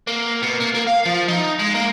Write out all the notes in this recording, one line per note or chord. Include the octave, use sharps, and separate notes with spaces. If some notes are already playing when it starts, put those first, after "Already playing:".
A#3
B2
A#3
A#3
F5
F3
D#4
G#3
A#3